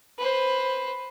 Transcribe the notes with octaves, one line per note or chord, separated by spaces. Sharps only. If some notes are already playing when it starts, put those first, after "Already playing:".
B4 C5